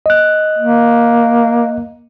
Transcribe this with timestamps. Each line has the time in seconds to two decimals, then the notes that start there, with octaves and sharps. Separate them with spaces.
0.06 D#5 F#6
0.59 A#3